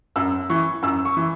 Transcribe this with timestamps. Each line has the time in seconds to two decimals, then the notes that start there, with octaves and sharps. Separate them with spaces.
0.16 F#2 E6
0.50 E3 C#6
0.83 F#2 E6
1.05 C#6
1.17 E3